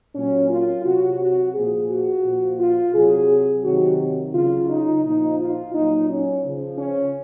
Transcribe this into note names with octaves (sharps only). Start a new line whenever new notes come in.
A#2 F#3 C#4
F4
C3 F#3 F#4
F#4
A#2 F3 G#4
F#4
A#2 F3
F4
C3 F#3 G#4
C3 D#3 F#3 F#4
C#3 F#3 F4
D#4
A#2 F3 D#4
F4
A#2 F#3 D#4
C#4
C#3 F3
C#4